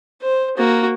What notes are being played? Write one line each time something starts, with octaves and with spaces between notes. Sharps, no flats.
C5
A#3 F#4